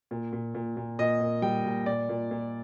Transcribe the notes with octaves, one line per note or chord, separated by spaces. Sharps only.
A#2
A#2
A#2
A#2
A#2 D#5
A#2
G3 G5
A#2
A#2 D5
A#2
A#2